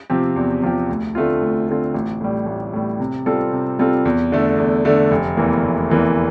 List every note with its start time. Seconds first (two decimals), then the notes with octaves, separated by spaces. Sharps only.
0.10 C3 F3 C4 G4
0.36 E2
0.62 C3 F3 C4 G4
0.89 D2
1.15 D3 A3 C4 F4
1.42 D2
1.68 D3 A3 C4 F4
1.95 A1
2.21 A2 G3
2.47 A1
2.73 A2 G3
3.00 C3
3.26 G3 C4 F4 A4
3.53 C3
3.79 G3 C4 F4 A4
4.05 E2
4.32 D3 A3
4.58 E2
4.85 D3 A3
5.11 F1
5.37 E2 E3 A#3
5.63 F1
5.90 E2 E3 A#3